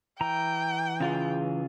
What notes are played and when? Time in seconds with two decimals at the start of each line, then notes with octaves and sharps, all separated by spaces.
0.21 E3 G5 A#5
1.00 C#3 F4 G#4